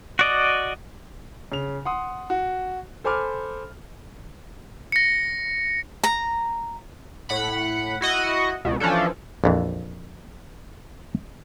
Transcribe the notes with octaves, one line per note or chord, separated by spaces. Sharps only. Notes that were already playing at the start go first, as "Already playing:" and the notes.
F#4 D5 D#5
C#3 F7
F#5 C6 D#6
F#4
A4 C5 G#5 B5 D6 F6
A#6 C#7
A#5
A2 F#5 B5
E4 F#4 D#5 F#5
C#2 B2
E3 F3 C#4 D4 A4
A#1 F2 E3